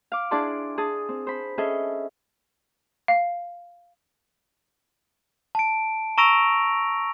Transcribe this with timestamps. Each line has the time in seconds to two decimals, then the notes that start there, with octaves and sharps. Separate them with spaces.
0.12 F5 D6
0.31 D4 E4 G#4 D5 A5 C6
0.78 G#4 A5 D#6
1.09 C4
1.27 C5 B5
1.58 C#4 G#4 A4 D#5 E5
3.08 F5
5.55 A5 D7
6.18 A#5 C#6 E6 A#6 D7 F7